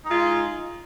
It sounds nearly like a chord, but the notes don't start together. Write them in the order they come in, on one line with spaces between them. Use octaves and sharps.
D#4 G#3 F4